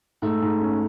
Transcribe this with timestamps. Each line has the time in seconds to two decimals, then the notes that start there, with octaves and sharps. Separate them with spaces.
0.22 G#2 A3
0.42 G#2
0.61 C#4